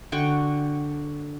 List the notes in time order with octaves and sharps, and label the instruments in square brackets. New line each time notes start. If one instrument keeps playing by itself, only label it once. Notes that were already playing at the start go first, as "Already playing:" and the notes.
[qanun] D3 F#4 G5 C#6